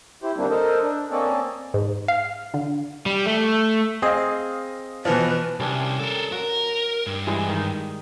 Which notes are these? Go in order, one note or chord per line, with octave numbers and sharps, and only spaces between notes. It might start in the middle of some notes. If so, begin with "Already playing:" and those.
E4 G4 C5
D#2 D3 G3 A#3 C4 D4
A4 A#4 C5 D#5
D4
A#3 C4 C#4 A4 D5 D#5
G#2
F5
D3
G3
A3
C4 G#4 D#5 F5
B2 E3 F3 B4
C2 G3 C#4 D4
A4 A#4
F#4 A#4
G2
E3 G3 G#3
D#3 D#4